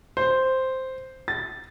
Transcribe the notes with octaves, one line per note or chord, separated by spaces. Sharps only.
C5
A6